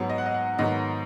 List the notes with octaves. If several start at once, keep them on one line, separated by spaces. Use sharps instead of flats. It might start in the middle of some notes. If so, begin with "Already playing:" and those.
Already playing: G#2 F#3 B3
D#5
F#5
D#5
F#5
G#2 D#3 F#3 B3 D#5